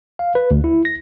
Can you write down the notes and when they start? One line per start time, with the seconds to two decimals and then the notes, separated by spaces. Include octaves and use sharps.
0.19 F5
0.35 B4
0.51 D2
0.64 E4
0.85 A#6